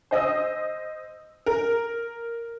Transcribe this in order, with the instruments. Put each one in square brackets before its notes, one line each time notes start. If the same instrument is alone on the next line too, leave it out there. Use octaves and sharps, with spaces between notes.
[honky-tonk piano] C5 D#5 D#6 E6
A#4